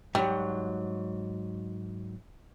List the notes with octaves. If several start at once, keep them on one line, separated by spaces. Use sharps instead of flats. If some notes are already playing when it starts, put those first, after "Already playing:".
G#2 F#3 G3